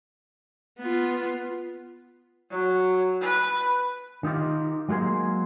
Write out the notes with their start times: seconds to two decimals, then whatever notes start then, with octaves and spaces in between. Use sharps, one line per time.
0.79 B3 F4
2.51 F#3
3.21 B4
4.23 D#3 D#4 F4 G4
4.89 F#3 G#3 A#3 G#4 C5